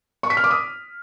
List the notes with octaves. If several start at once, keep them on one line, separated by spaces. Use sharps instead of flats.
C#6
B6
F6
D6
D#6